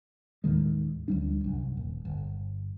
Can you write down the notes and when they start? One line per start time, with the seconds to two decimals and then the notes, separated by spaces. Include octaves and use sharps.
0.44 D#2 A2 D#3 G#3
1.08 D2 G3 D4
1.44 C2 F#2
1.77 D#1
2.05 G1